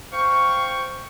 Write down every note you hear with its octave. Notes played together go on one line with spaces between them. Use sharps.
C5 F5 G5 C#6